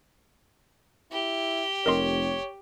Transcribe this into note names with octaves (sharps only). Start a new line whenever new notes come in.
E4 G4
F1 A#4 C#5 D#5 C6